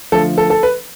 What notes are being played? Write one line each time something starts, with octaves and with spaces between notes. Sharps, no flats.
D3 F3 A3 A4
A4
A4
B4